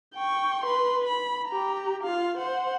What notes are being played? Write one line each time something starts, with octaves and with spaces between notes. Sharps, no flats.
G5 C#6
B4 C6
B5
G4 A#5
F4 F5
C5 F#5